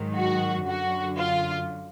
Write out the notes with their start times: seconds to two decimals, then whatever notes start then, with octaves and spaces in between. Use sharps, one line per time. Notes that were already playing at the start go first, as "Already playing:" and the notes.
Already playing: G#2 D#3 F#3
0.15 F#4
0.65 F#2 D3 F#3 F#4
1.16 F4